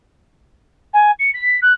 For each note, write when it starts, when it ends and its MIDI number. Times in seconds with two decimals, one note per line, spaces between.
0.93 1.11 80
1.19 1.30 97
1.34 1.58 95
1.61 1.73 90